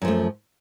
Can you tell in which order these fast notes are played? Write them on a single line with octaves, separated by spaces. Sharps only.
F#2 F3 A3